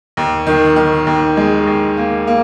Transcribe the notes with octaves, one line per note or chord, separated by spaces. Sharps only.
D#2
D#3
D#3
D#2
G#3
D#2
A#3
A#3